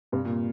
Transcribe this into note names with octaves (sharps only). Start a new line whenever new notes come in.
G2 C3
A#2